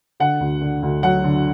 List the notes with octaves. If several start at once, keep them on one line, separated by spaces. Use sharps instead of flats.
D3 F#5
D2
D3
D2
F#3 F#5
D3